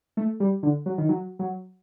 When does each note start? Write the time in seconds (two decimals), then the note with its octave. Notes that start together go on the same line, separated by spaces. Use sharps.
0.17 A3
0.40 G3
0.63 D3
0.86 F#3
0.98 D#3
1.09 F#3
1.39 F#3